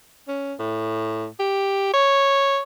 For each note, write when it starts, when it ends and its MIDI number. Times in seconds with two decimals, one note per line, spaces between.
0.28 0.54 61
0.59 1.26 45
1.40 1.90 67
1.94 2.60 73